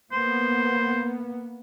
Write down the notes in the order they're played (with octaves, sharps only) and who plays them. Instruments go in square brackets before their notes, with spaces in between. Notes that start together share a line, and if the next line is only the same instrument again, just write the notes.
[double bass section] A#3 B3 [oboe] C5